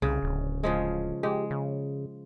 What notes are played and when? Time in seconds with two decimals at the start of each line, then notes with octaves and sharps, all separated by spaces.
0.02 C2 C#3
0.23 D1
0.64 C#3 F3 G#3
1.23 G#3 G4
1.51 C#3